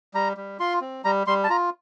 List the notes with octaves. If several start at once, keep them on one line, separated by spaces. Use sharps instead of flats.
G3 A#5
G3
F4 C6
C4
G3 A#5
G3 C6
A5
F4 A#5